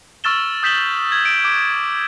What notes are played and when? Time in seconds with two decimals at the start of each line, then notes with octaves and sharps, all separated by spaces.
0.24 C#6 E6 F6 A6 E7 G7
0.63 D#6 G6 B6 E7 F#7 G7
1.12 G#6
1.25 D7
1.44 D6